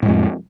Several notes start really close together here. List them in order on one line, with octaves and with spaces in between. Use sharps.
A2 G#3 F2